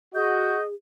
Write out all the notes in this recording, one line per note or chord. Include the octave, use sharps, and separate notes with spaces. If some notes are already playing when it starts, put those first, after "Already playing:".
F#4 G#4 D#5 G6